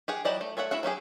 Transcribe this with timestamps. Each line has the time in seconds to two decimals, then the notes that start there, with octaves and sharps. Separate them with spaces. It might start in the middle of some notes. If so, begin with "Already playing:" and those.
0.08 G4 G#4 F#5
0.25 F#3 E4 G4 D5 D#5
0.41 A3
0.57 A3 C#5 E5 F#5
0.71 E4 F#4 E5 F#5
0.83 F#3 C#4 G4 G#4